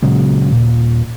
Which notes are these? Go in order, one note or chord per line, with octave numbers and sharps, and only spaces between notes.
A#2 C#3 F#3 G#3
D#1 A#2